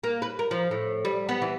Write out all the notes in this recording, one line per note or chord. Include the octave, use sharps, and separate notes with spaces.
A#3
B4
A#4
F3
A2
G3
B3
E3